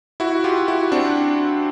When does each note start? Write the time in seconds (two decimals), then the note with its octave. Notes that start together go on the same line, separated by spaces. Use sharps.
0.20 E4 F#4
0.44 F4 G4
0.68 E4 F#4
0.92 C4 D4